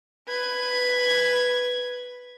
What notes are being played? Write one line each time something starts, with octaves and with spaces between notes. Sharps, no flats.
B4 G#6